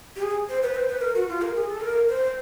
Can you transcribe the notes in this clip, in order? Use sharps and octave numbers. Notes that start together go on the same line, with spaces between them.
G4
G#4
C5
B4
C5
B4
A#4
F#4
F4
A#4
G#4
A4
A#4
C5